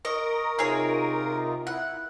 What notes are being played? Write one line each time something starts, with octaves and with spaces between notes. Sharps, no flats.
A#4 D#5 C#6
C3 D#4 F4 G#4 C#5
E4 F#5